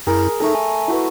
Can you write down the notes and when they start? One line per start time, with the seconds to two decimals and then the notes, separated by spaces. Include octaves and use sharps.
0.07 F#2 E4 G#4 A#4
0.40 A3 D#4 A4 A#5
0.54 G#5
0.88 E4 F#4 B4